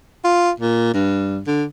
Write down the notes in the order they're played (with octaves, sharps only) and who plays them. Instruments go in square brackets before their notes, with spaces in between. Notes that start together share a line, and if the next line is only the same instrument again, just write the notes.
[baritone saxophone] F4
A#2
G2
D3